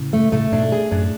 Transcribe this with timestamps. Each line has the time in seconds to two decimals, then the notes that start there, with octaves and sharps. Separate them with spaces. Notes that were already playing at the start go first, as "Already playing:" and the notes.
Already playing: A2 C#3
0.13 A3
0.32 A2 C#3 A3
0.52 G#2 B2 D4
0.72 G#4
0.91 F#2 A2 D4